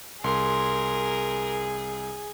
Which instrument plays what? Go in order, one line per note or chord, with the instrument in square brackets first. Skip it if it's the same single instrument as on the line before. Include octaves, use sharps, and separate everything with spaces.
[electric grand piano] C2 [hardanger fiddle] G#4 [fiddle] A#4 [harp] C6